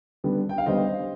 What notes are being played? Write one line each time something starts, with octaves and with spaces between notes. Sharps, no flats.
D3 G3 B3
G5
F5
D3 G3 B3 C5 D#5